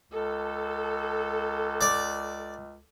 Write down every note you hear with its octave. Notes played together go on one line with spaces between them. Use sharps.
C#2 A4
D5